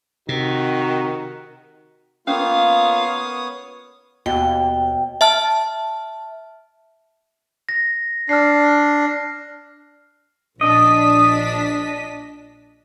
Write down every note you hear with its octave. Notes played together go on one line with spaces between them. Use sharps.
C3 D#3 F#4
A#3 B3 C#4 F4 C#5 F5 D#6
D#2 B2 G5
E5 A5 F6
A#6
D4 F6 C7
A#1 D4 D#5 B6